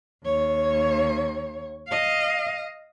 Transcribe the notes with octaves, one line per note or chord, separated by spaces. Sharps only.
D#2 C#5
D#5 F5